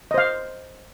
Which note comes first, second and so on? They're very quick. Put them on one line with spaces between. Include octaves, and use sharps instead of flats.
D#5 C5 F5